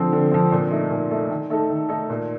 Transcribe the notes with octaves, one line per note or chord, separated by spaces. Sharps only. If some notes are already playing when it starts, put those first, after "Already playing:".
Already playing: D3 F3 C4
D3
F3 C4
A#2
A3 D#4
A#2
A3 D#4
D#3
A3 D#4 A4
D#3
A3 D#4 A4
A#2